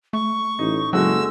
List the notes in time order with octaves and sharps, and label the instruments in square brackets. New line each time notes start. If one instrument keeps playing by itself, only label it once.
[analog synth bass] A3 [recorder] C#6
[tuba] A1 [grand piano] D#4
[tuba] F#1 [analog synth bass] F#3 [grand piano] G#3 A3 F#4 [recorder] E6